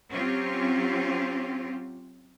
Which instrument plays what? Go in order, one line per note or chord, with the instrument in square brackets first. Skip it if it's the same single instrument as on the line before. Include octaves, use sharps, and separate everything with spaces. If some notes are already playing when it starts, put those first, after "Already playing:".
[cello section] F#3 C4 C#4 F4 G4